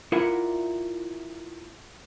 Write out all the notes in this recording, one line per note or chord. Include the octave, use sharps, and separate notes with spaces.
E4 F4 A#4 D5 E5 F#5